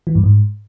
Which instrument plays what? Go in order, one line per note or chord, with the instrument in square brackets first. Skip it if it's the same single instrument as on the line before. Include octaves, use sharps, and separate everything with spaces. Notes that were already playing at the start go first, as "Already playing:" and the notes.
[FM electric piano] E3
G2
G#2